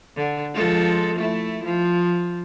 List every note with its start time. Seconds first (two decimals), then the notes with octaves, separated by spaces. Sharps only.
0.17 D3
0.54 F3 G#3 A4
1.16 A3 E4
1.64 F3